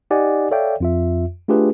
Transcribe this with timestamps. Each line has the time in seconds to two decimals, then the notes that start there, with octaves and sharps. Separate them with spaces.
0.11 D#4 G4 D5 D#5 F#5 G#5
0.51 A4 C#5 D5 E5 F5 G5
0.81 F2 F4 E5
1.48 A3 D4 F4 G4 G#4 B4